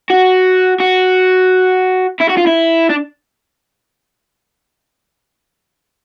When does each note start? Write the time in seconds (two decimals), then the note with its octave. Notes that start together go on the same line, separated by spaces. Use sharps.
0.10 F#4
0.80 F#4
2.20 E4
2.29 F#4
2.37 F4
2.47 E4
2.90 D4